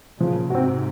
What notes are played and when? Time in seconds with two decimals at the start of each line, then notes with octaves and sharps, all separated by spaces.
0.21 A#2 C#3 F3
0.50 G#2 C3 C4 F#4